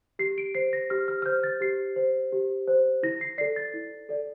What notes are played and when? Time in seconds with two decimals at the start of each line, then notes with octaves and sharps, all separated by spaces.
0.19 G4 C7
0.38 D7
0.55 C5 C7
0.73 A#6
0.90 G4 F6
1.08 F6
1.22 F6
1.26 C5 G6
1.44 A6
1.61 G4 C7
1.96 C5
2.32 G4
2.67 C5
3.03 E4 A#6
3.21 C7
3.38 A4 D5 C7
3.56 A6
3.74 E4
4.09 A4 D5